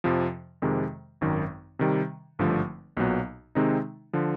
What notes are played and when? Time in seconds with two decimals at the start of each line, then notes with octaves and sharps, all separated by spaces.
0.04 F2 C3 F3
0.62 F2 C3 D#3 G#3
1.21 G#1 F#2 D#3
1.79 C3 D#3 G3
2.39 G#1 G2 D3 F3 A3
2.97 B1 A#2 F#3 B3
3.55 C3 D#3 G#3 C4 D#4
4.13 D3 F3